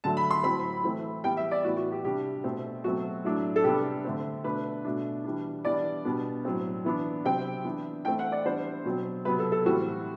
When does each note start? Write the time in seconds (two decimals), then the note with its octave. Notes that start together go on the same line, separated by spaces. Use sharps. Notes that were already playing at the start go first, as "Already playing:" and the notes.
0.04 D3 F#3 A3 A5
0.17 B5
0.31 C6
0.44 A2 F#3 C4 B5
0.84 E3 A3 C4
1.24 E3 G3 B3 G5
1.37 E5
1.51 D5
1.64 A2 E3 B3 F#4
1.77 F#4
1.92 G4
2.04 C3 G3 D4 G4
2.44 B2 A3 C4
2.84 B2 F#3 A3 C4 F#4
3.24 A2 F#3 A3 D4
3.56 A4
3.64 C3 G3 B3 D4 G4
4.05 D3 A3 C4
4.44 B2 A3 D4 B4
4.84 B2 A3 D4
5.24 E3 G3 D4
5.65 E3 G3 B3 D4 D5
6.05 B2 G3 B3 D4
6.45 A2 F#3 C4
6.85 E3 B3 D4
7.25 C3 F#3 C4 G5
7.65 E3 B3 D4
8.05 E3 A3 C4 G5
8.19 F#5
8.32 D5
8.45 E3 G3 B3 D4 C5
8.85 B2 F#3 C4
9.25 C3 F#3 B3 B4
9.39 A4
9.52 A4
9.65 A2 E3 G3 C4 F#4